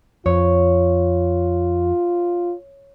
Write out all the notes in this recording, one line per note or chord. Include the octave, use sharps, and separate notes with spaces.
F2 F4 C#5